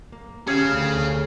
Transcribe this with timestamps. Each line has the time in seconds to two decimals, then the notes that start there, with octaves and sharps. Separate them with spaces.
0.12 A#3
0.47 C#4 G4 G#4 F5
0.69 D2 A3 F6